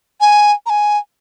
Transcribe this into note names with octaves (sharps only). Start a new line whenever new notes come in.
G#5
A#5
G#5